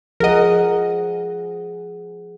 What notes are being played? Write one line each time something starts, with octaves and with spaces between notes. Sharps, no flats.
F3 G#4 A#4 D#5 F#5